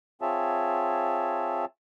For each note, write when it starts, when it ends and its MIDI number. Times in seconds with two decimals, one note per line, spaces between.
0.22 1.65 60
0.22 1.65 65
0.22 1.65 68
0.22 1.65 73
0.22 1.65 76
0.22 1.65 81